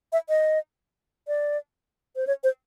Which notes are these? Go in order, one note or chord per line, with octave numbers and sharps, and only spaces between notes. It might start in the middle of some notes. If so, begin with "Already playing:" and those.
E5
D#5
D5
C5
C#5
C5